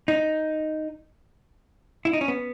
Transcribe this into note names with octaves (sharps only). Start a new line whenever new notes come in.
D#4
E4
D#4
C#4
B3